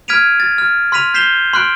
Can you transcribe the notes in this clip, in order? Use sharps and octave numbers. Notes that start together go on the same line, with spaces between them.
F6 G#6 B6 D7 D#7 F7
A6
F6
C6 F6 B6 D#7 F7
G6 B6 C7 E7 F7 G7
C6 F6 F#6 D7